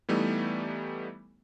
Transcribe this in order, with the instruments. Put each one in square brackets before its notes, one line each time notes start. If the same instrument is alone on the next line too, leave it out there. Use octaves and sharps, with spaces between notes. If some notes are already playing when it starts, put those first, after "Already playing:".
[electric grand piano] E3 G3 A3 B3 D#4